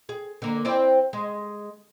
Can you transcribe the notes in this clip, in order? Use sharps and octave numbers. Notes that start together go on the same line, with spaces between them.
G#4
D3 A#3
C4 E4 D5
G#3